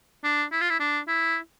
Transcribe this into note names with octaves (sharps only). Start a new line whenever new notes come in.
D4
E4
F4
E4
D4
E4